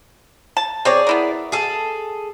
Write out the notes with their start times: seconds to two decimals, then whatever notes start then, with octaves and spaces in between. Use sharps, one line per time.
0.57 A5
0.85 C4 G#4 C#5 D5
1.07 B3 E4 A#4
1.52 G#4 A4